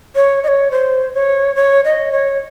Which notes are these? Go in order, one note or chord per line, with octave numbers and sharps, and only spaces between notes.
C#5
D#5
C#5
C5
C#5
C#5
D#5
C#5